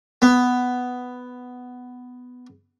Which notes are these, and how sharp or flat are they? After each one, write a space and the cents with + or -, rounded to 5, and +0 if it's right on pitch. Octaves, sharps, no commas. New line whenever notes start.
B3 +10